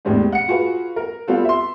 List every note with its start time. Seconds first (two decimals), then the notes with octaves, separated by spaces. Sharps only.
0.05 E2 A2 G3 G#3 C4 D4
0.32 F#5 C#7
0.48 F4 F#4 G#4 B4
0.96 A#4
1.28 G3 B3 C4 F4 F#4 A4
1.45 E5 C6